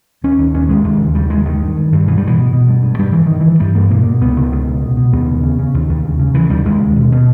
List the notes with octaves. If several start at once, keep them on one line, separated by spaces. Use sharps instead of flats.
D#2 C#4
D#2
D#2 C#4
D#2 G#3
D#2
C#3
D#2 G3
D#2 G#3
G2 D#3
G2
G2
G2
B2 E3
G3
B2
E3
B2
B2
G2
G2
G2 G3
G2 E3
G2 D#3
G2 E3
G2 G3
G2 A#3
B2 A#3
B2
C#2 B3
C#2
C#2
B2
B2
B2
D#2 B3
C#3
C#3
C#3
D#2
D#2
C#3
C#3
C#3 E3
D#2 G3
D#2 G#3
C#3
B2
B2